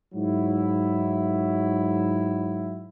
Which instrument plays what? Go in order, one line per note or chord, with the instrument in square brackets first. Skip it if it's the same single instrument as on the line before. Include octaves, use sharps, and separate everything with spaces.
[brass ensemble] G#2 F#3 E4